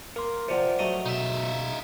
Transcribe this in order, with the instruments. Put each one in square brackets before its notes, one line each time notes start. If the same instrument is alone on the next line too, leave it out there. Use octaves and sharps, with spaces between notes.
[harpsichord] A#3 [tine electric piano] A#4 C6
[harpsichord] C3 F3 [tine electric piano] C5 D5 F#5
[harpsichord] F#3 A3 D#5
[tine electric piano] B2 [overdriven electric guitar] D#4 E5